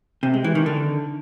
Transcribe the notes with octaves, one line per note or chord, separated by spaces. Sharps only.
C3
G#3
E3
D#3
D3